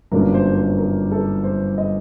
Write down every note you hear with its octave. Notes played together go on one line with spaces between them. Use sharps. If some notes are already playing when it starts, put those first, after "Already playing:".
G1 F#2 F#3 A#3 D4 A#4
C5
C5
A#4
A4
C5
D#5